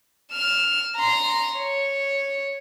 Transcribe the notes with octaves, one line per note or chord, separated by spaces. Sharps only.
F6 E7
A#5 C6
C#5